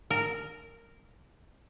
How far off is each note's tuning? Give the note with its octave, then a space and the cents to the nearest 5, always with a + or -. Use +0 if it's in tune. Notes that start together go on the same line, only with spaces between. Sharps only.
A#4 -10